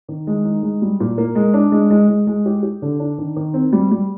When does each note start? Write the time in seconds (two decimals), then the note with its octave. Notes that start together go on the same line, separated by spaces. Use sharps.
0.08 D#3
0.27 G#3
0.45 D#4
0.63 G#3
0.82 G3
1.00 A#2
1.18 A#3
1.35 G#3
1.54 D4
1.72 G#3
1.90 G#3
2.08 G#3
2.27 G#3
2.46 G4
2.63 G4
2.82 D3
2.99 D4
3.18 D#3
3.36 D#3
3.54 C4
3.73 G3
3.91 G3